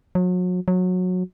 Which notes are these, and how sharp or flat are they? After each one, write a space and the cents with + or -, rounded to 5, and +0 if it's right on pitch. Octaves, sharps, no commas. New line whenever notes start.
F#3 -35
F#3 -20